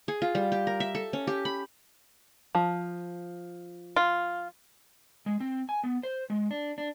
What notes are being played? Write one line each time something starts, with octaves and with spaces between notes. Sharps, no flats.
G#4
F4
G3
G4
A#4
E5
A4
C#4
G4
B5
F3
F4
G#3
C4
G#5
B3
C5
G#3
D4
D4